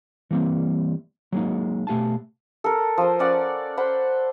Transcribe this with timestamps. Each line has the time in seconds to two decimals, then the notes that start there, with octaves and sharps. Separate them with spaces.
0.31 E3 G3 A#3 C4
1.32 F#3 G#3 A#3 D#4
1.87 B2 A3 G4 F5 G#5 A5
2.64 A4 A#4
2.98 F3 C5
3.19 C#4 D5 F#5
3.77 C5 F#5 B5